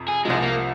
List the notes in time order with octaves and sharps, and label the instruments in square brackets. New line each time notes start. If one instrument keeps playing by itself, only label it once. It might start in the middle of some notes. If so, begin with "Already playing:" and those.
Already playing: [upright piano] F2 C3
[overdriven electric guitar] G#4
[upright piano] C2 C3 F3 [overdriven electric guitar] G#3
[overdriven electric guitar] A#3